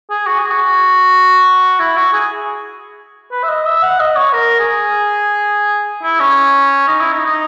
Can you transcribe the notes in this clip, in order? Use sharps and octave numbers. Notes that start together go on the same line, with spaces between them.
G#4
F#4
G#4
F#4
E4
F#4
G#4
B4
E5
D#5
E5
F#5
D#5
C#5
A#4
G#4
E4
C#4
D#4
E4
D#4
D#4